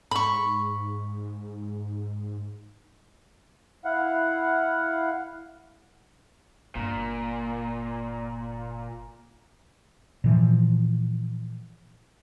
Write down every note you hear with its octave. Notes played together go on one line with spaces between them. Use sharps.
G#2 B5 C#6
E4 F5 F#5
G1 A#2
A#2 E3 F3